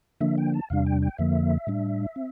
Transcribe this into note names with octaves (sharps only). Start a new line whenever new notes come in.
D3 F3 A#3 D4 E5
G5
A5
E2 C3 G3 D4 F5
G5
G5
F2 D3 F3 A#3 E5
A2 G3 D4
C4